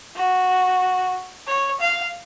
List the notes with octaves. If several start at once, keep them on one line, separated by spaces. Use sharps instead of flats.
F#4
C#5
F5